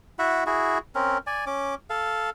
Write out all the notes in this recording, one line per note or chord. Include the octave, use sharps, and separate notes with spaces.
E4 F#4 E5 F#5
E4 F#4 G#4
C4 C#4 A#4
D5 G#5
C#4 D6
A4 F5